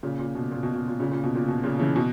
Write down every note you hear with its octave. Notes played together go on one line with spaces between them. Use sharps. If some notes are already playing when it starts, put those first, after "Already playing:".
A#2 C#3
A#2
B2
A#2
B2
B2
A#2
A#2 C#3
A#2
B2
A#2
B2
A#2 C#3
C#3 E3
B2